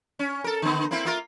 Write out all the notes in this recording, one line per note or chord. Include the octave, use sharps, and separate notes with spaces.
C#4
A4 A#4
D3 B3
A#3 C4 E4
A#3 F4 A#4